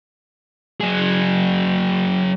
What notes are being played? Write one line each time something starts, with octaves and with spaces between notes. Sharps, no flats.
F#3 G#4